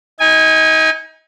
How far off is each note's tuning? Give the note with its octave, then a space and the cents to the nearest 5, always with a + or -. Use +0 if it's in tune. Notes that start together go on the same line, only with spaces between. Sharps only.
D#4 +30 G#5 -20